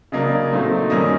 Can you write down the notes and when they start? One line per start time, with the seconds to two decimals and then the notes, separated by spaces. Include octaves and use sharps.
0.12 C#3 F#3 A#3 D4 D#5
0.52 A#2 F#3 A3 C4 D#4
0.90 F#2 D#3 G3 A#3 C#4 D#5